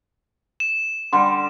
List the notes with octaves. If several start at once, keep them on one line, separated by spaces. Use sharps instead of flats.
E7
D3 G3 B5 C6